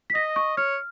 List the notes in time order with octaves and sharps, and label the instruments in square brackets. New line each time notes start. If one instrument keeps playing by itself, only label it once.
[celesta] B6
[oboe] D#5 [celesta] A#6
[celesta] C#6
[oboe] C#5 [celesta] F6